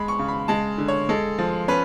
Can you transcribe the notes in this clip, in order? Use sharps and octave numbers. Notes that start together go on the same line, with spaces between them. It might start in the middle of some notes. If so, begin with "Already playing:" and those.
Already playing: G#3 B5
C#6
C#3
B5
G#3 A5
D3
C#5
G#3 A4
F3
C#4 B4